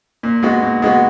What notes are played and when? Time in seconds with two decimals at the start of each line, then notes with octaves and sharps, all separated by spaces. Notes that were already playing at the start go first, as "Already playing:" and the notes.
0.23 A#2
0.43 G#3 B3 F#4
0.63 A#2
0.82 G#3 B3 F#4